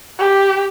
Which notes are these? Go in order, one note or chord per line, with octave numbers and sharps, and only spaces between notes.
G4